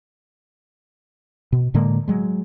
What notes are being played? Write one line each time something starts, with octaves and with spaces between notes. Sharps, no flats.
B2
A2 D3 G#3 A#3
F#3 G#3